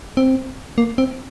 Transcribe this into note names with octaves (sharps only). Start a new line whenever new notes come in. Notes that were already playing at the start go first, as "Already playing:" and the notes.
C4
A#3
C4